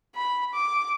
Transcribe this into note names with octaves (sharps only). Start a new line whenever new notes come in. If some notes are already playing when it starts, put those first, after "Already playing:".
B5
D6